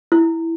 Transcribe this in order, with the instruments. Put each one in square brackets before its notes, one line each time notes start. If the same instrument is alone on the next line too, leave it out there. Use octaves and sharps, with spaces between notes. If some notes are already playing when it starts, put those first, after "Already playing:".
[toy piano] E4